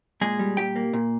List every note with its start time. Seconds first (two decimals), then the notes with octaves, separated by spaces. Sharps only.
0.21 A#2 G#3 G#4
0.39 G3
0.57 A#2 G4 G5
0.76 A#3
0.93 A#2